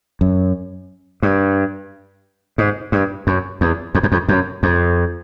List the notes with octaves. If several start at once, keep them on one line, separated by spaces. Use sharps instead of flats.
F#2
G2
G#2
G2
F#2
E2
F2
F#2
F2
F#2
F2